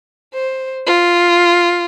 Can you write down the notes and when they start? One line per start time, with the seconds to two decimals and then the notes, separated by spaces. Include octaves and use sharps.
0.34 C5
0.87 F4